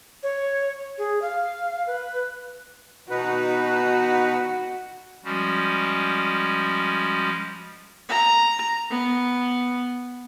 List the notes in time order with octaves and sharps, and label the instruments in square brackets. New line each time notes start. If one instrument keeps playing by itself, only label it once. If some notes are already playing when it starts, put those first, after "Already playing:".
[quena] C#5
G#4
F5
B4
[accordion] B2 D#4 B4 [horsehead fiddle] F#4
[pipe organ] F3 G3 G#3 C#4 F#4
[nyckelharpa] A#5
B3